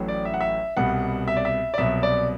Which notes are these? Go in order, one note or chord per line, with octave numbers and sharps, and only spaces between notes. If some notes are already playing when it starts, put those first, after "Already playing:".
Already playing: A1 A2 F#3
D5
E5
F#5
E5
C2 B2 G3 F#5
E5
D5
E5
D5
C2 B2 F#3 E5
D5